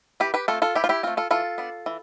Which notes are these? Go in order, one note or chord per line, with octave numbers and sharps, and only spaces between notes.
E3 G4 B4
G4 B4
A3 C4 F4 A4
F4 A4
E3 E4 G4
F4
E4 G4
A3 C4 F4
F4 A4
E3 F4 A4
B3 D4
E3